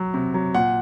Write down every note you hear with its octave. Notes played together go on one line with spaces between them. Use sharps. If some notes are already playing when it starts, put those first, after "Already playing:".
Already playing: F#3
C3
F#3
A#2 F#5